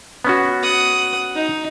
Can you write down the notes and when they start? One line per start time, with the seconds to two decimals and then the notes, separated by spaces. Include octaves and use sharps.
0.25 B3 C#4 F#4
0.63 F#5 D#6
1.35 D#4